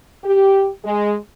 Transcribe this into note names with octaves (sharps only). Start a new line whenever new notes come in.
G4
G#3